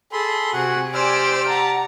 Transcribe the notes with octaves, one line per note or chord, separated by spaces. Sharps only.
G#4 A4 B5 C6
C3 F#4 F#5 G#5
G4 C5 D5 E6 F6
F#5 A5 A#5